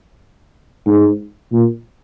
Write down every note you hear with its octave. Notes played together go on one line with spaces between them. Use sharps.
G#2
A#2